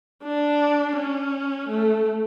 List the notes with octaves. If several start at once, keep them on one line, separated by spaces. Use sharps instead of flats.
D4
C#4
A3